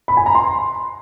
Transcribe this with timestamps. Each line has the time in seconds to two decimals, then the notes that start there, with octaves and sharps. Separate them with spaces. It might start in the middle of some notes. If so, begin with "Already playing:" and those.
0.08 B5
0.17 G#5
0.26 A#5
0.35 C6